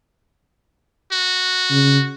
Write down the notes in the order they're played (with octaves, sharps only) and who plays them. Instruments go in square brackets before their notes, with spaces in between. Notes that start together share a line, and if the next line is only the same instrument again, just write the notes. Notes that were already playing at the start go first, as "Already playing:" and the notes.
[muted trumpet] F#4
[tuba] C#3